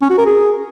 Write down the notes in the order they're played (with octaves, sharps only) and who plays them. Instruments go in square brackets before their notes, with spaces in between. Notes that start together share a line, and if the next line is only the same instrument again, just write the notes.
[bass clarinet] C#4
F#4
A#4
G#4